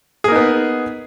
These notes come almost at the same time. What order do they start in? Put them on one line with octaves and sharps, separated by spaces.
G#4 A#3 D#4 B3